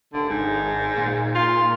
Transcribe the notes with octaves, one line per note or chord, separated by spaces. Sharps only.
F1 D3
G#1 G#2
A#2
F4